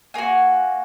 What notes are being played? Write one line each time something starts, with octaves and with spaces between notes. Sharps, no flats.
A#3 F#4 G#5